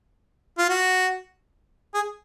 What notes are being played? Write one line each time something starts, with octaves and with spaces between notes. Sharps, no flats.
F4
F#4
G#4